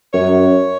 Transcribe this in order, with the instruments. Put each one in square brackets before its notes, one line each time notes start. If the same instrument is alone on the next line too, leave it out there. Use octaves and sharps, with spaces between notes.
[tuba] F#2 [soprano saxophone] C#5